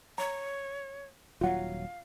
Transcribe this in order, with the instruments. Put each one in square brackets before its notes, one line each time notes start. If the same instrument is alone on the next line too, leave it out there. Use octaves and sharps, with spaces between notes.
[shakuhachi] C#5 [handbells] A#5
[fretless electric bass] D#1 F#3 [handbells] F4 F#5 [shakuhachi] F5